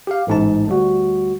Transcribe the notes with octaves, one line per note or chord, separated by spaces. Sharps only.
G4 F5
A1 G#2 A5
D2 G3 F#4